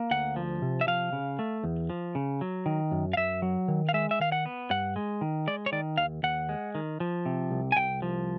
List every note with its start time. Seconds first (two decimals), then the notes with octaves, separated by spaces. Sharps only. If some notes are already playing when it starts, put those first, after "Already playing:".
Already playing: A#3
0.11 D2 F#5
0.36 F3
0.62 C3
0.81 E5
0.87 F3 F5
1.13 C#3
1.39 A3
1.64 E2
1.90 F3
2.15 C#3
2.41 F#3
2.66 D#3
2.91 F#2
3.13 F5
3.17 F#2 E5
3.42 F#3
3.68 D#3
3.89 F5
3.94 G#3 E5
4.11 E5
4.20 D#3 F5
4.32 F#5
4.46 B3
4.70 G2 F#5
4.96 G#3
5.21 D#3
5.47 G#3 D5
5.66 C#5
5.72 D#3 D5
5.98 D#2 F5
6.23 D#2 F#5
6.49 G#3
6.75 D#3
7.00 F3
7.26 C3
7.51 C2
7.72 G#5
7.76 C2 G5
8.02 F3